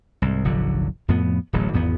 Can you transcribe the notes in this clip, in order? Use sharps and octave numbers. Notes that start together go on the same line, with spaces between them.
C2 G#2
F1 A#1 D3 F#3
F2 A2 F3 B3
D1 A1 F#3
G#1 E2 B3